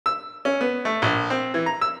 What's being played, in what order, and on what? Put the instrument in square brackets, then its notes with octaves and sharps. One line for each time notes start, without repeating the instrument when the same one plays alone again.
[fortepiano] E6
C#4
B3
A3
A#1
C4
E3
A#5
E6